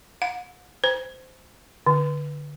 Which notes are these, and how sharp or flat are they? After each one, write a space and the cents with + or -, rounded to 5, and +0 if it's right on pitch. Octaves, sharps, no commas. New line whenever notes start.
F#5 -45
C5 -20
D3 +0